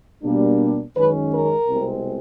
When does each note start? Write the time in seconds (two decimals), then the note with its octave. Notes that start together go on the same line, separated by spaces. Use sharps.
0.23 B2 G3 A#3 D4
0.96 F#2 D#3 G#3 C#4 B4
1.32 A#4
1.68 C2 B2 G#3 C4